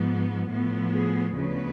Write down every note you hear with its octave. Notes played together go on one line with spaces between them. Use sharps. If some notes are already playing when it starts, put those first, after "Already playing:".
Already playing: G#2 F3 B3
A2 F3 B3
G#4
D2 C#3 F3 B3 B4